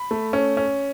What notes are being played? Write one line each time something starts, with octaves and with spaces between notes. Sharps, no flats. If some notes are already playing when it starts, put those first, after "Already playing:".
Already playing: B5
A3
C#4
C#4